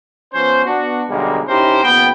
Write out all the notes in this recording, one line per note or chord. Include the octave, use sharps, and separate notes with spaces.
F3 B3 C#4 C5
B3 D4 F#4
B1 D3 G3 G#3 A#3
C#4 D#4 E4 G4 A#4 C5
F#1 B3 G5